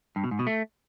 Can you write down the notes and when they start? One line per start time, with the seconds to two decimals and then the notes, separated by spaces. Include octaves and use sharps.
0.16 G2
0.24 B2
0.31 G#2
0.39 B2
0.47 A3